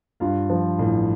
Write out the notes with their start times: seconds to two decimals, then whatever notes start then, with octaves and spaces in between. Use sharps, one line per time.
0.20 G2 F4 F5
0.50 F3
0.79 A1